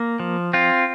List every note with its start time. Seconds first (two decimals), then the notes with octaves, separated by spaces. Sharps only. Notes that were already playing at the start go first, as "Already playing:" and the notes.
Already playing: A#3
0.20 F3
0.53 C4 F4